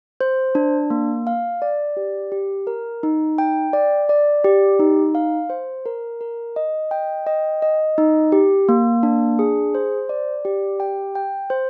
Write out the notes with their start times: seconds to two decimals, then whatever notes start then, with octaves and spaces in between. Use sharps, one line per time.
0.21 C5
0.55 D4
0.90 A#3
1.27 F5
1.62 D5
1.97 G4
2.32 G4
2.67 A#4
3.03 D#4
3.38 G5
3.73 D5
4.09 D5
4.44 G4
4.80 D#4
5.15 F5
5.50 C5
5.86 A#4
6.21 A#4
6.56 D#5
6.91 G5
7.27 D#5
7.62 D#5
7.98 D#4
8.32 G4
8.69 A#3
9.03 D4
9.39 G#4
9.75 C5
10.09 D5
10.45 G4
10.80 G5
11.15 G5
11.50 C5